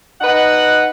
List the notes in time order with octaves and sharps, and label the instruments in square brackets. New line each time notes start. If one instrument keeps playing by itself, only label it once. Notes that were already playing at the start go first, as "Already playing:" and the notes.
[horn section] D#4 B4 F#5